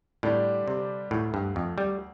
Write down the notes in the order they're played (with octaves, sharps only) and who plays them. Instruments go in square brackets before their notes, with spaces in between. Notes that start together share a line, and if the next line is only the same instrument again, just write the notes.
[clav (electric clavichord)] A2 [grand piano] D3 G3 D4 G4 D5
[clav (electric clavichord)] C3
[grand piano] D2 D3 A3 [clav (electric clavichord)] A2
[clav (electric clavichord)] G2
F2
G3